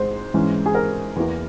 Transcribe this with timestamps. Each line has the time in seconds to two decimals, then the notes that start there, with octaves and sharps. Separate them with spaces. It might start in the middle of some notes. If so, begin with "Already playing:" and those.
Already playing: G#2 G#3 C5
0.34 G#2 E3 G#3 C#4
0.66 G#4
0.75 A#4
1.16 E2 E3 A#3